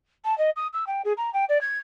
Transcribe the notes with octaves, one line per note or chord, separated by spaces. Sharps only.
A5
D#5
D#6
E6
G5
G#4
A#5
G5
D5
G#6